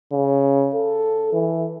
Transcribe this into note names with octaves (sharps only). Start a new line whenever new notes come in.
C#3
A4
E3